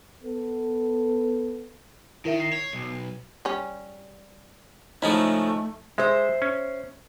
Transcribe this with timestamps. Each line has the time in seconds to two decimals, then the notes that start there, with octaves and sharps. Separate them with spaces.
0.22 B3 A4
2.25 D#3 E4 A#4 E5
2.40 C7
2.53 C#5
2.73 B1
3.45 G3 C#4
5.02 C#3 F3 G#3 A3 D#4 E4 A4
5.98 G#3 C5 E5
6.42 C#4